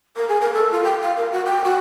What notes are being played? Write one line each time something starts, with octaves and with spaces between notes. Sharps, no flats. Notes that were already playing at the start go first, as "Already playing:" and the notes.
A#4
G#4
A#4
A4
F4
G5
F5
A#4
F#4
G5
F#4